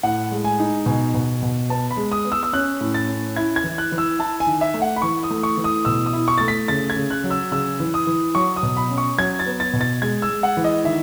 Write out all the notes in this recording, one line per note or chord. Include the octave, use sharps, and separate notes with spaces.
A2 F#5
G#3
G#5
D#4
B2 G#5
B2
B2
B3 A5
B5
G#3
D#6
B3
E6
E6
C#4 F#6
A2
A6
C#4
E4 G#6
G#6
E3
F#6
E3
E6
E4 A5
G#5
D#3
E5
A3
F#5
B5
E3 C#6
D#6
A3
C#6
E3
D#6
B2 E6
D#6
E4
C#6
A3 A6
B6
C#3 A6
G#6
C#3
F#6
F#3
E6
C#3 E6
E3
D#6
E3
F#3 C#6
D#6
B2
B5
C#4
C#6
F#3 G#6
A6
B3
A6
B2
A6
G#3 G#6
E6
G#3
F#5
E3
D#5
D#3 E5